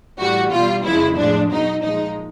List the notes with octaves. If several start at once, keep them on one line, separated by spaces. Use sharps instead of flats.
A2 E3 G3 F#4
B2 G3 F4
F2 C#3 F3 G#3 E4
A2 F3 G#3 D4
B2 F#3 D#4
A#2 F3 G#3 D#4